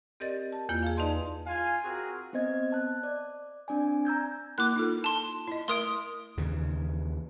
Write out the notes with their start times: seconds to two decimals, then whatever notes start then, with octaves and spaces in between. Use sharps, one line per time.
0.20 C4 G4 A#4 D5 D#5 A6
0.52 A5
0.69 E2 A#3 E4 F4
0.83 G#4 F5
0.97 D#4 B4 D5 D#5 A5 C6
1.47 F4 F5 G#5
1.84 C4 F#4 G#4 A#4
2.33 B3 C4 C5 D#5 G#6
2.72 A5 F#6
3.03 D5
3.68 C4 D4 D5 G#5
4.05 A#5 E6 G6 G#6
4.58 A#3 E4 A#4 D6 F#6
4.76 D#4 F4 A4
5.04 A5 C6
5.48 E4 D#5
5.68 A3 A#4 C6 D#6 D7
6.37 D#2 C#3 E3